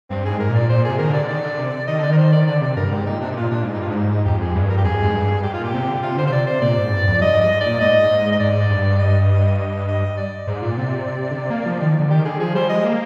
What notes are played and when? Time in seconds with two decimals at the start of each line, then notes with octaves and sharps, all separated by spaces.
0.10 G2 C4
0.25 G#2 G#4
0.40 A#4
0.49 A#2
0.55 D5
0.69 A#2 C5
0.85 C3 G#4
0.99 D#3 A#4
1.09 D3
1.14 D5
1.28 D#3 D5
1.43 D3
1.58 C3
1.87 D#3 D#5
1.98 D3 D5
2.09 D#3 A#4
2.17 C5
2.33 D5
2.47 D3 D5
2.62 C3 D5
2.76 G2 A#4
2.91 G#2 G4
3.06 A#2 D#4
3.21 C3 D4
3.32 D#4
3.36 A#2 F4
3.50 A#2 D4
3.63 G#2 D#4
3.73 D#4
3.76 G2 F4
3.89 G#2 D4
3.96 D#4
4.10 D#4
4.25 F2 G4
4.40 G#4
4.54 G2
4.69 A#4
4.77 G4
4.84 F2 G#4
5.02 G#2
5.14 G2
5.43 G#2 G4
5.53 F4
5.59 A#2
5.64 G4
5.74 C3
5.87 D3
6.02 C3 F4
6.17 D3 C5
6.27 C5
6.30 C3 D5
6.47 C5
6.61 A#2 D5
6.77 G#2
6.91 G2
7.07 F2
7.21 G2 D#5
7.36 G#2 D#5
7.50 G#2
7.61 D5
7.66 A#2
7.81 G#2 D#5
8.10 G#2
8.32 D#5
8.40 G#2 D5
8.70 G2
8.99 D#5
9.59 D#5
9.88 D#5
10.17 D5
10.47 G#2
10.62 A#2
10.77 C3
11.31 D3
11.37 C3
11.50 A#3
11.66 F3
11.80 D#3
11.99 D3
12.10 D#3 G4
12.25 D3 G#4
12.39 F3 G#4
12.54 G3 C5
12.69 D#5
12.75 G#3
12.84 A#3